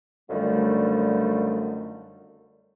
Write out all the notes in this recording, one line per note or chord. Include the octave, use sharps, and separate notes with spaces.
F#2 D3 D#3 F3 G3 A3